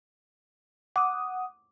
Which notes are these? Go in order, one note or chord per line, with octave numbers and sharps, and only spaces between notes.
F#5 D6 D#6